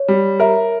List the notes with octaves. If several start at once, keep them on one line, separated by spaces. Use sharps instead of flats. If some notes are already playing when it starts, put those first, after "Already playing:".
Already playing: C#5
G3
A#4 E5